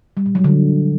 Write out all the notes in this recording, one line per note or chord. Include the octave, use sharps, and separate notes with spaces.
G3
A#2
F#3
D3